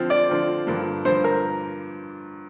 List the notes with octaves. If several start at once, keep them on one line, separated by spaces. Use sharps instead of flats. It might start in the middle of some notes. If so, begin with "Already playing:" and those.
Already playing: D3 F3 C4 F4
D5
D3 F3 C4 F4
G2 D3 F3 A#3
G2 D3 F3 A#3 C5
A#4